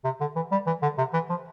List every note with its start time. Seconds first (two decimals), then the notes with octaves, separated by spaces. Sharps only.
0.05 C3
0.20 D3
0.36 E3
0.52 G3
0.67 E3
0.82 D3
0.98 C3
1.13 E3
1.30 F3